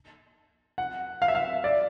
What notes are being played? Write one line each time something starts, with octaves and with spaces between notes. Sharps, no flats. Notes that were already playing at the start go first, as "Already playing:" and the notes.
F#5
F5
E5
F5
D5